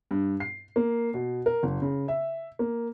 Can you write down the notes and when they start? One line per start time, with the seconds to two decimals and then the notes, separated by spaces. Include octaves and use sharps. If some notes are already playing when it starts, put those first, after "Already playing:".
0.11 G2
0.40 C7
0.76 A#3
1.14 B2
1.46 A#4
1.63 F#1
1.82 C#3
2.08 E5
2.59 A#3